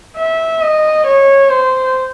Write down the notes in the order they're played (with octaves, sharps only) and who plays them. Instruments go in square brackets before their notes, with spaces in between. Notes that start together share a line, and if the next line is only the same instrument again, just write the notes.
[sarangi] E5
D#5
C#5
C5